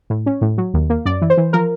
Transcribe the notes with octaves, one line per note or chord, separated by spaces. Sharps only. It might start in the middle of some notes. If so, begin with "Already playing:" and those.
A2
C#4
A2
F#3
D#2
A#3
F#2 D5
E3
C5
E3
F3 A#4